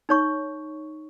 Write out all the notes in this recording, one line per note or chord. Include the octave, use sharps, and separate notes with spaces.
D#4 C#5 C#6